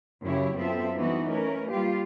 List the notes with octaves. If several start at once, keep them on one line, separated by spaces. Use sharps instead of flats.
F#2 C#3 F#3 E4 G4 C#5
F#2 B3 C4 F4 A4 E5
E3 G3 B3 D#4 E4 F#4
A3 C#4 A#4 B4
G3 A#3 F4 G4